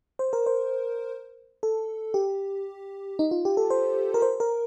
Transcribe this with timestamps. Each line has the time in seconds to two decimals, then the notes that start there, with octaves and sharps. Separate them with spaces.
0.19 C5
0.33 A#4
0.46 C5
1.63 A4
2.14 G4
3.19 D#4
3.31 F4
3.45 G4
3.57 A4
3.70 C5
4.14 A#4
4.22 C5
4.40 A#4